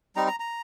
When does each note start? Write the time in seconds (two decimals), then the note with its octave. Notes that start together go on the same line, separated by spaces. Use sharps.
0.16 G3 C4 D#4 A#5
0.28 A#5
0.40 A#5